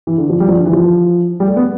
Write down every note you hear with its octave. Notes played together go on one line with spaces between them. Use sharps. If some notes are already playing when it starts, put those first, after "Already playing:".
E3
D3
F3
G3
F3
D3
E3
F3
G3
A3
B3